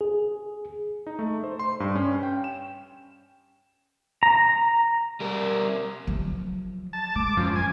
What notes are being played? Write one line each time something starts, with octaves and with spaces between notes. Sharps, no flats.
G#4
D#4
A3
C5
C6
G2
C#4
G5
E7
A#5
G3 A#4
F3 F#3
A5
G#3 D6
F#2 F3
G#5